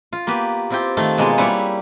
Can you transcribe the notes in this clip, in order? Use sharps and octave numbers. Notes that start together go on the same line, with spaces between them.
F4
A#3 B3 G4 B4
C4 E4 F4 G4 G5
D#3 A3 F4
B2 G#3 A#3 B3 F4 G#4
G3 A#3 E4 G4 B4 C#5